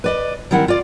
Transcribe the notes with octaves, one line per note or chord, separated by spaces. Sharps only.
B4 D5 D#5
D#3 G3 C4 E4 A#4 F#5
F4 D5